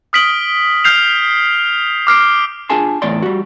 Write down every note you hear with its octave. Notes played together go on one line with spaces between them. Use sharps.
D#6 F6 B6 D7 F#7 G7
F6 G6 C7 F7
D6 F6 C7 D7
D4 F4 G#4 G#5 A5 C6
E2 A2 C#5 D5 C6
G3 F#4